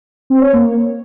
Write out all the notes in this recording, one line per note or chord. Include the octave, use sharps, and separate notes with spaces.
C4
C#5
A#3